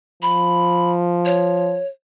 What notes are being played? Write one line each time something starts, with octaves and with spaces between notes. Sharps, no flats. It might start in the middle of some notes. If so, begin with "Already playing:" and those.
F3 B5
C#5